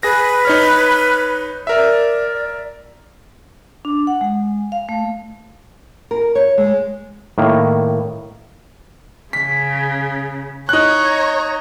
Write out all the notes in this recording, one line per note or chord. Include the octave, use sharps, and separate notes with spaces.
G#4 B4 A#6
D#4 C#5 F6
A#4 D5 E5
D4
F#5
G#3
F5
A3
A#4
C#5
G#3
A2 D#3 A#3
C#3 B6
D#4 C#5 A#5 F#6